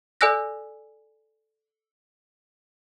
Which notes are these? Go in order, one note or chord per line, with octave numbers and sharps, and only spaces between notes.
A4 D5 G#5 E6 F#6 A#6